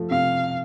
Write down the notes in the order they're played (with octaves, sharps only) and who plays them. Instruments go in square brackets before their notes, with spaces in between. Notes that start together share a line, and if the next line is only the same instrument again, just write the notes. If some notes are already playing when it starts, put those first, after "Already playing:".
Already playing: [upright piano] F3 A3
[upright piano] C3 [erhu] F5